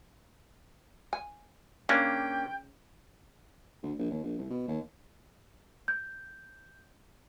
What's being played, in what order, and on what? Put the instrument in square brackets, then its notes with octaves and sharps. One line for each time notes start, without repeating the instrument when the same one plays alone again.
[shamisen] G#5
[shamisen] C#3 [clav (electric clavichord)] A#3 C#4 D4 [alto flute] G5
[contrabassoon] D2
A#1
D#2
A#1
C2
B2
D#2
[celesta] G6